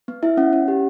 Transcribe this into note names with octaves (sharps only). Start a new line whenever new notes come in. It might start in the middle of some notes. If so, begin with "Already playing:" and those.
B3
E4 E5
C#4 F#5
C#4
G4